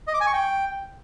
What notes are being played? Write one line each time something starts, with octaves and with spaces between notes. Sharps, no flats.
D#5
D6
G#5
C#6
G5